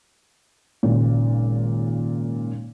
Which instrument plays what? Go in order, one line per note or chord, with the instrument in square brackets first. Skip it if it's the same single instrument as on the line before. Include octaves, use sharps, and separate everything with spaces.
[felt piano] G#1 A#2 C#3